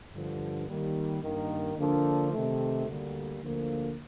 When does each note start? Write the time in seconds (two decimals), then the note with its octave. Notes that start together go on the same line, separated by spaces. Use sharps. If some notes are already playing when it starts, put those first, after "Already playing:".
0.13 G2 D3 F3
0.67 D#3 G3 A#3
1.22 G2 D#3 A#3 D#4
1.77 D3 F3 A#3 D4 A4
2.31 C3 D#3 A3
2.86 D2 D3 G3 A#3
3.42 D2 D3 F3 A#3